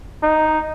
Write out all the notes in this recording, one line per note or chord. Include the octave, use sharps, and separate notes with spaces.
D#4